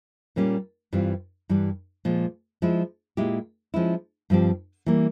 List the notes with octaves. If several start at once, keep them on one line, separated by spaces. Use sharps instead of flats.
A#2 G3 A#3 C#4 G4
G2 E3 G3 C4 F4
G2 E3 G3
A#2 F3 G#3
F3 G#3 E4
A#2 G#3 E4 G4
F3 G#3 C#4 E4
G2 F3 C4 G4
E3 G3 A#3